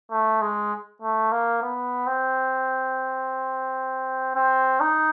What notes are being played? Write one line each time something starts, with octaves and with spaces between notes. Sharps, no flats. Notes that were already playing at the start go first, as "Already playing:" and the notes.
A3
G#3
A3
A#3
B3
C4
C4
D#4